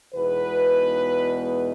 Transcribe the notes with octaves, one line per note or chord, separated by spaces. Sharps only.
E2 B2 G#3 B3 D#4 B4